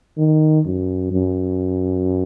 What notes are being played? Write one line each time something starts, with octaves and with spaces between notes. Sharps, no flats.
D#3
F#2
F#2